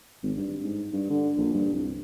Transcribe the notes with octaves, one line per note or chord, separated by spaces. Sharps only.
G#1
G2
G#2
G2
D3
A#1
G2
C2